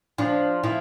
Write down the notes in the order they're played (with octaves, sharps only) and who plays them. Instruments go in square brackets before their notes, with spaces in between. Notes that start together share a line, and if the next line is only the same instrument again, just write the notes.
[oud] F3 [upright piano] D4
[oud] F3 [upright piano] E4